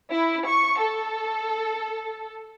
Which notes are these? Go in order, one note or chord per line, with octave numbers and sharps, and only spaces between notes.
E4
C#6
A4